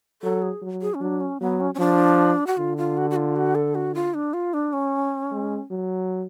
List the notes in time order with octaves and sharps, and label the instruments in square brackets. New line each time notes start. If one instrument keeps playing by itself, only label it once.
[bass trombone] F#3 [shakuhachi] A4
[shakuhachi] G#4
[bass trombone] F#3
[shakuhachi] G#4
C#4
[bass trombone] F#3 [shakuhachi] D4
[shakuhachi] C#4
[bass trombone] F#3 [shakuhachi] B3
[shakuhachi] C#4
C#4
[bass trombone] F3 [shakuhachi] D4
[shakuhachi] F#4
[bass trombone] D3 [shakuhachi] F4
[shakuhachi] F4
F#4
F#4
F4
F#4
A4
F#4
F4
D4
F4
D4
C#4
[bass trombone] G#3
F#3